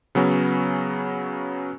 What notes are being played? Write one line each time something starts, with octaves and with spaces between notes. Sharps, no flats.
C#3 F#3 B3 C#4